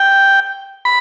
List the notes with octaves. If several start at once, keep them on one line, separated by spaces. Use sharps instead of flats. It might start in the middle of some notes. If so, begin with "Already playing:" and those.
Already playing: G5
B5